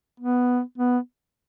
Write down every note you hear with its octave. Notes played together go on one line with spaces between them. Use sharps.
B3
B3